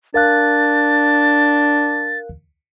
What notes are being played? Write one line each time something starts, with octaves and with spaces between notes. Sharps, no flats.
D4 A#4 F5 F#6 A6